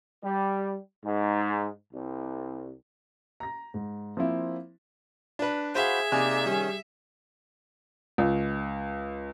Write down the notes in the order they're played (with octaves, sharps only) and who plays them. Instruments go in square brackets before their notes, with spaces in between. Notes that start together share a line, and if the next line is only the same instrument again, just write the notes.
[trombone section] G3
G#2
C2
[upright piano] A#5 A#6
G#2
F3 A#3 C4 E4
[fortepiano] D4 B4
[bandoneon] F#4 B5 G6 [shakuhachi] G#4 [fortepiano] C5 F5 [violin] E5
[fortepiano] C3 G#5 [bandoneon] A#3 D#4 D5
[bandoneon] D#3 C#4 [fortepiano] G3
[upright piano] C#2